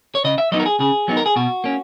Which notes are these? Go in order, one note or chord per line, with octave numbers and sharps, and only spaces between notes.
C#5
C#3 D#5
E5
F#3 B3 D#4 D#5
A#4
G#4
C#3 G#4
F#3 B3 D#4
A#4
G#4
B2 F#4
A#3 C#4